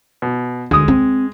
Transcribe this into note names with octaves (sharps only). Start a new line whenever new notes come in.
B2
D2 G#3 D#6
C4